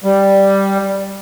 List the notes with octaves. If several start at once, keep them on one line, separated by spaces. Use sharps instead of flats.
G3